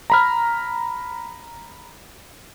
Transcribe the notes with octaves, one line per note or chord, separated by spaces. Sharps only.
A#5 B5 F6